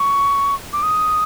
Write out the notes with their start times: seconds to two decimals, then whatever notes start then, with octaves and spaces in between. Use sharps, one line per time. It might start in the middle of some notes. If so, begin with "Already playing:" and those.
Already playing: C#6
0.73 D6
0.83 D#6